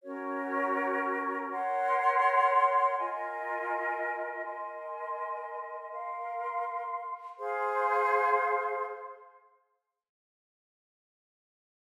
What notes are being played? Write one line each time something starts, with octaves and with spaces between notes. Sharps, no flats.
C#4 F#4 A#4 C#5
A#4 C#5 F#5 C6
F4 A#4 D#5 G#5
A#4 D#5 G#5 C6
A#4 F5 C6
G#4 C5 F5 C6